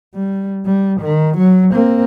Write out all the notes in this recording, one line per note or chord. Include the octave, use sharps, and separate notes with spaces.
G3
G3
D#3
F#3
A#3 C4